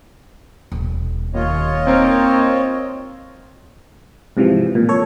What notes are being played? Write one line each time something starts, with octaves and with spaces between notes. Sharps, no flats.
D#1 B2
D#2 F4 C#5 D#5
A#3 C4 D#4 A#4
G#2 C3 E3 F3
A#2
A4 C#5